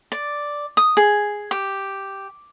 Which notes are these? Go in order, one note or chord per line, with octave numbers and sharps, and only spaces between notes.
D5
D#6
G#4
G4